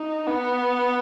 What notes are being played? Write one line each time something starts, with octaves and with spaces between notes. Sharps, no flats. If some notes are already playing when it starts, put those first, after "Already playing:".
Already playing: D#4
B3